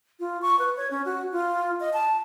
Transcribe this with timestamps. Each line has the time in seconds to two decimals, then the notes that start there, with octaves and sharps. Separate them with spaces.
0.20 F4
0.42 C#6
0.59 B4
0.77 C#5
0.91 C#4
1.05 F#4
1.32 F4
1.80 D#5
1.93 A5